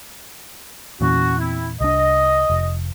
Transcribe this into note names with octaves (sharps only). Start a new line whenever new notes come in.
E2 A#2 E3 C#4 F#4
C4 E4
C2 D4 D#5
F1